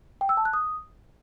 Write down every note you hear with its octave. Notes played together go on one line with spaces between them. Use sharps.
G5
E6
A5
F#6
D#6